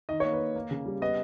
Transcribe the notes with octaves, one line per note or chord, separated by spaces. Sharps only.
D#3 D#5
C#5
A#3
B4
A#3
A#3
C#3
G3
B3 D#5